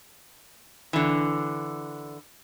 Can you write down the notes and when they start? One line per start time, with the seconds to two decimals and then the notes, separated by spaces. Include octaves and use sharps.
0.93 D3 E3